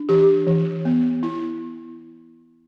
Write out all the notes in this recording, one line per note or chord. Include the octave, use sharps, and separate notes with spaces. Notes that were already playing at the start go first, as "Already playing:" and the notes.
Already playing: D4
E3 G4
E3
B3
E4